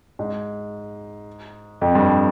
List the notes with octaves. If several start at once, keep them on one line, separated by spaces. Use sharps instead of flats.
G#2
F2
G2